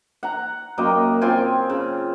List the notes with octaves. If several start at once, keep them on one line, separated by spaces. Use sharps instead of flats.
F#5 A#5
F#2 A#3 D#5 G5
C4 F4 G5 G#5
C#3